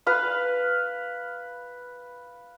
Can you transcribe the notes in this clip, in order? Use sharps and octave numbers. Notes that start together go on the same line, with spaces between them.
B4 F5